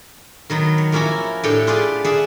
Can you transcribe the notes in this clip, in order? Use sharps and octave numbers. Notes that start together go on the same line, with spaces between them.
D#3 F#3 B3
C#5
F3 A#3 C#4 E4 F#4
A2 D4 G4 A4 C#5 G5
F4 G4 G#4 B4 D5
G#4 D5 E5 F#5 G#5